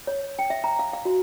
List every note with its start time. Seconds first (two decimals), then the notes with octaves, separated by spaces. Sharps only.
0.07 C#5
0.39 G5
0.50 E5
0.64 A#5
0.79 F5
0.93 F5
1.05 F#4